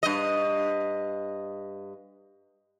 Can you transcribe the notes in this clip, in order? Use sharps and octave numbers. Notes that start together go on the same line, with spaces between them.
G2 D#5